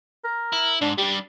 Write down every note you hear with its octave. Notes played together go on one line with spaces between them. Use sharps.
A#4
E4
G#2 D4
G3 D4 G4